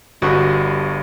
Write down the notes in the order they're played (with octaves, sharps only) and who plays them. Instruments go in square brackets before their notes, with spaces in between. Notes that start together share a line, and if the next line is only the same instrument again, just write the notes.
[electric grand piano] G1 G2 [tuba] G3 [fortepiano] F#4